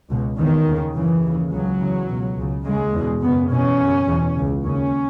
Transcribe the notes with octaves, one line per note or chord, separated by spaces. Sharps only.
C#2 B2
E2 B2 D#3
D#2 C#3
F#2 C#3 E3
D#2 C#3
C#2 C#3 F#3
E2 C#3
C#2 B2
C#2 C#3
D#2 C#3 G#3
E2 B2
F#2 C#3 B3
E2 B2 C#4
F#2 C#3
E2 B2
C#2 C#3
D#2 C#3 C#4